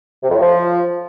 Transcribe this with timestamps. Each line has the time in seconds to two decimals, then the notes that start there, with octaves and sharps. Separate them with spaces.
0.23 C3
0.29 F2
0.35 A2
0.41 F3